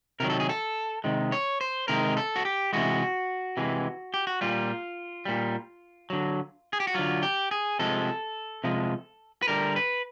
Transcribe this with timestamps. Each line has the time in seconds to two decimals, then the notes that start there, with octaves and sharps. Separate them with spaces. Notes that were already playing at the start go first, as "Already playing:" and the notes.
0.20 C3 D#3 F#3 A#4
0.30 A4
0.40 G#4
0.49 A4
1.04 C3 D#3 G#3
1.32 C#5
1.61 C5
1.88 C3 D#3 G#3 A#4
2.17 A4
2.36 F#4
2.45 G4
2.73 C3 E3 G#3 F#4
3.57 C3 E3 G#3
4.14 G4
4.27 F#4
4.41 A#2 G3 F4
5.25 A#2 G3
6.10 D3 F#3
6.73 G#4
6.80 G4
6.87 F#4
6.95 D3 F#3 F4
7.23 G4
7.51 G#4
7.79 C3 F3 G#3 A4
8.64 C3 F3 G#3
9.42 B4
9.48 D3 G3 A#4
9.76 B4